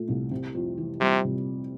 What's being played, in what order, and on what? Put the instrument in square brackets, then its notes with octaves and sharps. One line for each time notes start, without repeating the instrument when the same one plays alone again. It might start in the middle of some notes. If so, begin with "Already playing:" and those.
Already playing: [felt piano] A#2 A3
C2
C3
F2
E3
[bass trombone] C3 [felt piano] G3
[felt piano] C3